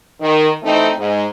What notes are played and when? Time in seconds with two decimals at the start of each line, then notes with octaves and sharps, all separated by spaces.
0.20 D#3
0.63 E3 A3 C4 D#4
0.97 G#2